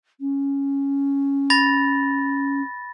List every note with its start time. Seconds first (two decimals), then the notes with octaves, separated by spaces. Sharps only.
0.20 C#4
1.50 B5 A6 A#6